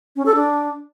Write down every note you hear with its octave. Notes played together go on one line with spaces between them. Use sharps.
C#4
A4
D4